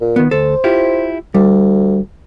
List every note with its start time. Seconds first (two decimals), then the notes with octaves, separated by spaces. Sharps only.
0.01 A#2
0.16 D#3 B3
0.31 D2 A4 C5
0.64 E4 F4 G4
1.34 D2 G3